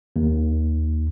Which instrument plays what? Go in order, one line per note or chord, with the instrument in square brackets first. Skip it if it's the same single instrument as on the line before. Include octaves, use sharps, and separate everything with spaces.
[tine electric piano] D#2